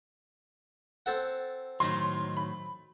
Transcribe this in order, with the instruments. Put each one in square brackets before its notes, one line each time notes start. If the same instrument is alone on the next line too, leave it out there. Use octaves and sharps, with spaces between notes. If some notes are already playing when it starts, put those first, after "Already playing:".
[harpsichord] C4 A4 F#5
[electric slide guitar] A2 D#3 F#3 [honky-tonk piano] C6
[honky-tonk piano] B5